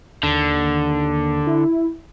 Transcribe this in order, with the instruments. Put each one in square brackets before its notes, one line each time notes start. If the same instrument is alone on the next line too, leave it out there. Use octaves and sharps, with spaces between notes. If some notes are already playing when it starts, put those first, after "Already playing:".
[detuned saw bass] D#2 [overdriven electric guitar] D3
[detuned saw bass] E4